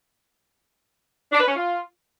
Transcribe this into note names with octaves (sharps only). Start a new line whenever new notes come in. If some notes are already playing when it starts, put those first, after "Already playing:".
D4
B4
C#4
F4